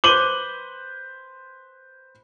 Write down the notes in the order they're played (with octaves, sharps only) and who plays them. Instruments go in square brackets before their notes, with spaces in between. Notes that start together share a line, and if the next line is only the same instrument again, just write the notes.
[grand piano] B4 C5 [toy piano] D6 [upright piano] D#7 F#7 G7